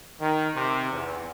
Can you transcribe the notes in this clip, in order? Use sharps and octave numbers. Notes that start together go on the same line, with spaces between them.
D#3
C3
E2